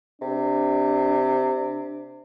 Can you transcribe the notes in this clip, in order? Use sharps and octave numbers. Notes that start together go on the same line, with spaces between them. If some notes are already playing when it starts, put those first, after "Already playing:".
C3 D4